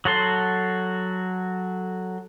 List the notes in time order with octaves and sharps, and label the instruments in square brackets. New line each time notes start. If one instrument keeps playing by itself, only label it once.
[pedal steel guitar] F#3 F#4 A4 C6